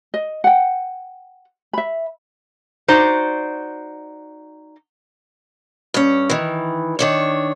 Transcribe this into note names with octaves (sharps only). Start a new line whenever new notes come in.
D#5
F#5 G5
E5 B5
D#4 F#4 C5 D5
G2 C#4
D#3 E3
D#3 D4 C#5